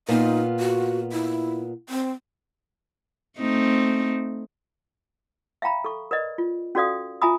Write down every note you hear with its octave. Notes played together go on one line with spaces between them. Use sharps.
A#2 B3 D#4 F4
F#4
E4
C4
A3 C4 D#4
E5 F5 G5 A#5 B5
A4 C#6
A#4 B4 D5 D#5
F4
C#4 F#4 A4 D5 F5 D#6
F4 E5 G#5 A#5 B5 D#6